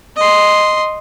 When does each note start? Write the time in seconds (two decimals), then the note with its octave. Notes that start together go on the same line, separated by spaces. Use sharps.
0.17 D#5 C6